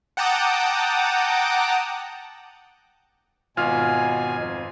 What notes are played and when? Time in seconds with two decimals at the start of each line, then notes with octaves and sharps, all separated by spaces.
0.17 F#5 G5 A5 A#5 D6 D#6
3.57 G#1 B2 F4 G#5 F6
4.37 F2